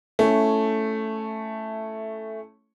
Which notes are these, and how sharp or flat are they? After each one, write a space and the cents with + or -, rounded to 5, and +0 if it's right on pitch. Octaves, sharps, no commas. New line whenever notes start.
A3 +0 C#4 +0 E4 +10